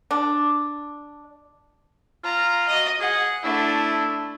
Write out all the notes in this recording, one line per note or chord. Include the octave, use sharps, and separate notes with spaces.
D4
F4 A#5
F#4 D#5
G#4 F#5
A3 D4 E4